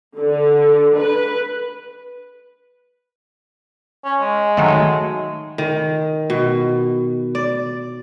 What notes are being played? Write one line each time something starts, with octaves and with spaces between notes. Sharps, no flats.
D3
B4
C#4
G#3
D#3 F#3 A3
D#3
B2
D5